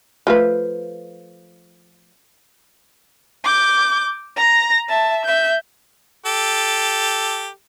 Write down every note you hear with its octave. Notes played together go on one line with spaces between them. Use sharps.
F3 A3 B4
D6 G6
A#5 A#6
E5 A5
E5 G6
G4 A4